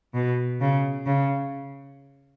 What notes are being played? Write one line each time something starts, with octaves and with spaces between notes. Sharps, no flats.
B2
C#3
C#3